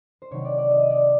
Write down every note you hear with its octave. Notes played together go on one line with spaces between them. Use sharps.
C5
C3 D#3 F#3 C#5
D5
D5
D#5
D5